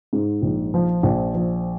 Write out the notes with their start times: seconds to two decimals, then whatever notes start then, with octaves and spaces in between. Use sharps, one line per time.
0.13 G#2
0.42 A#1
0.74 F3
1.03 A#1
1.35 F3